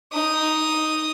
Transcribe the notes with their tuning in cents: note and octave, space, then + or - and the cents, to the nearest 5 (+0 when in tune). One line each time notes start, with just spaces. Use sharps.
D#4 +0 D#6 +0